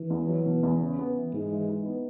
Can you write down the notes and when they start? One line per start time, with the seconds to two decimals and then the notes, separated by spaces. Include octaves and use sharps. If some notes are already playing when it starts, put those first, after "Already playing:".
Already playing: E3
0.10 E2
0.28 F#3
0.46 B2
0.63 E2
0.80 C#3
0.99 B3
1.16 E3
1.33 G#2 G#3
1.51 E3
1.69 D#4
1.85 B3